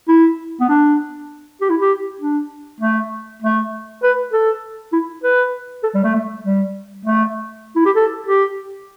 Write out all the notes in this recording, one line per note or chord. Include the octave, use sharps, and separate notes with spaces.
E4
B3
D4
G4
E4
G4
D4
A3
A3
B4
A4
E4
B4
A4
G3
A3
A3
G3
A3
E4
G4
A4
G4